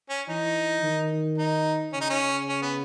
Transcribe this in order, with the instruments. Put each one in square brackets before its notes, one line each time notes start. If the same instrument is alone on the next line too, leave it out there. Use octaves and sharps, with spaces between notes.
[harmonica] C#4
[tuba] E3 [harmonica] D#4
[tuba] D#3
[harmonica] D#4
[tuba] C#3 [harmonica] C#4
[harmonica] D#4
C#4
C#4
B3